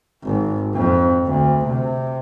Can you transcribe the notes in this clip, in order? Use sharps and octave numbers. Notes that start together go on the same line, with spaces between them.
G#1
F2
D2
C3